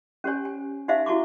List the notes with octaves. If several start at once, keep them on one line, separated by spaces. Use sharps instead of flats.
C#4 G4 C5 C#5 G#5
G#5
D#4 G4 C5 E5 F5 G#5
E4 F#4 A5 C#6 D6